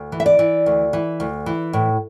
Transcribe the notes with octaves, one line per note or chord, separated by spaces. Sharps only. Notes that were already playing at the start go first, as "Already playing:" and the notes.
Already playing: D2
E3
E5
D5
E3
D2
E3
D2
E3
A2